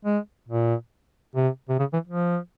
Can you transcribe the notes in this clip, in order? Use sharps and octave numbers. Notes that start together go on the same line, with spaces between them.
G#3
A#2
C3
C3
C#3
E3
F3